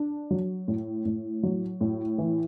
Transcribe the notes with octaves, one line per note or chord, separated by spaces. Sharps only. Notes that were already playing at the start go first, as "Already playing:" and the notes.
Already playing: D4
F#3
A2
A2
F#3
A2
E3